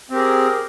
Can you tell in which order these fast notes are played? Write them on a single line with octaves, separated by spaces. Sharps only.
C4 G4 A#4 G#4